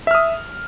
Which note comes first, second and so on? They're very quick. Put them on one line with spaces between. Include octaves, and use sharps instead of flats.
E5 F6 D#6